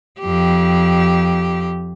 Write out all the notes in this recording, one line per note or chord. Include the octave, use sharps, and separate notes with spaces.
F2 G4